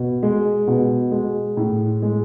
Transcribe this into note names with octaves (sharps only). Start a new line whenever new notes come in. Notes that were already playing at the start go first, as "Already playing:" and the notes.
Already playing: B2
G#3
B2
G#3
A2
G#3